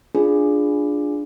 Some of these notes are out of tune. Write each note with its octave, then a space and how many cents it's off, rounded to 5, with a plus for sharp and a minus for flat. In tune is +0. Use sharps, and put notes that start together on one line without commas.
D4 +0 F4 +0 G#4 +0